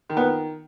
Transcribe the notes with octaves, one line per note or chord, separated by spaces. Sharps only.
D#3
B3